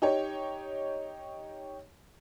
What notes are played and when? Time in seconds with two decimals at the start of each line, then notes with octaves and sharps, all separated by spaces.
0.02 D#4 G4 C#5